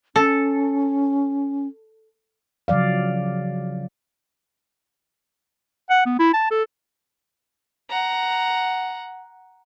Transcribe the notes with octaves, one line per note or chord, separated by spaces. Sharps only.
C#4 A4
C#3 F3 F#3 D5 F5
F#5
B3
E4
A5
A4
F#5 A#5